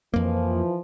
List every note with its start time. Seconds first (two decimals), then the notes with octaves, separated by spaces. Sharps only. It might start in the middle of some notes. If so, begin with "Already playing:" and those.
0.14 F2 E3 F3 A#3